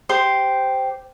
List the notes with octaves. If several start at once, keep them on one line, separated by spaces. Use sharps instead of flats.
G4 C5 C6